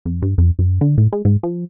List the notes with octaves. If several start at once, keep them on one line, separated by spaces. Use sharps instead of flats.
F2
G2
F2
F#2
D3
A2
G#3
G#2
F3